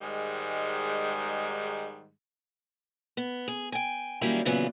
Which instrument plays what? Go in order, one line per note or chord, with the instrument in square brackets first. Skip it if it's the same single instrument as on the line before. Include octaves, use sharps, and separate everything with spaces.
[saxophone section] G#2 D#3 G3 G#3
[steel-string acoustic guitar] B3
G#4
G5 G#5
D#3 F#3 G3 A#3 C#4 E4
A#2 C#3 E3 F#3 B3